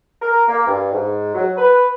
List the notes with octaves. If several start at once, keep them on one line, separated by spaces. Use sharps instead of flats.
A#4
A#3
G2
G#2
F#3
B4